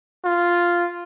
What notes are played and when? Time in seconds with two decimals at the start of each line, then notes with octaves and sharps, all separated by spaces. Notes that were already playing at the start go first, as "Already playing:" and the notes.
0.25 F4